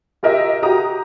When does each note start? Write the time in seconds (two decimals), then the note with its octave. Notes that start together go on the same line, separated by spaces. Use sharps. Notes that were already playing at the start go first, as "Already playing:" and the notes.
0.23 F4 G4 A#4 D#5 E5
0.62 F#4 G4 A#5 D#6